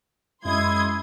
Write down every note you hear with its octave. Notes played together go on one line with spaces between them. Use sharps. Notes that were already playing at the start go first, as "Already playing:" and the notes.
F#2 G#3 E4 C6 D#6 G#6